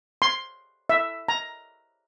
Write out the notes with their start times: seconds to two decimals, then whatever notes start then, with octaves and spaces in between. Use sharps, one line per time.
0.22 C6
0.89 E5
1.28 A#5